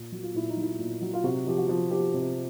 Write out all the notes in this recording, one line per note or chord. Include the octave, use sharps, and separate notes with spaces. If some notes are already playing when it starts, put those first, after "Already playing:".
Already playing: A#2
F#3
F4
A#2 E4
D#4
F#3
E4
A#2
F#3
F4
C3 F#4
F3 G4
F#4
F3
F3 G4
C3